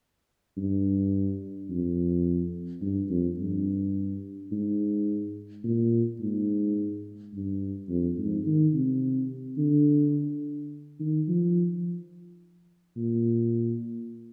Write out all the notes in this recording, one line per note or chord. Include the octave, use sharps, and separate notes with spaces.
G2
F2
G2
F2
G2
G#2
A#2
G#2
G2
F2
G#2
D#3
C3
D3
D#3
F3
A#2